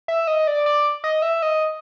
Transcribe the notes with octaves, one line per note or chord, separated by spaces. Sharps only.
E5
D#5
D5
D5
D#5
E5
D#5